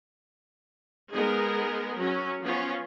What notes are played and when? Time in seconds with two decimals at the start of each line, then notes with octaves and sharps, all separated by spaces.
1.12 G#3 B3 D#4 G#4 A#4
1.96 F#3 C#4
2.41 F3 B3 C#4 F4